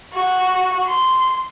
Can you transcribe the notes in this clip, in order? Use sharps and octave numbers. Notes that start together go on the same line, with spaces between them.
F#4
C6